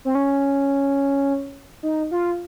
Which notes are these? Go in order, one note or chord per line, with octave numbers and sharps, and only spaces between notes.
C4
C#4
D#4
F4